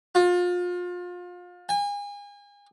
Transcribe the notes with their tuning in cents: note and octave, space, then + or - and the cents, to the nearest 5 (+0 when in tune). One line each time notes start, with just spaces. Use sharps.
F4 +30
G#5 -35